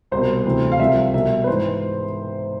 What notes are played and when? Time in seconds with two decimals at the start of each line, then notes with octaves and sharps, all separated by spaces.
0.11 C2 B2 C5
0.46 D2 C3 E3
0.72 F5
0.79 C2 C3 F3 E5
1.14 C2 B2 E5
1.44 B4
1.47 G#2 E3 C5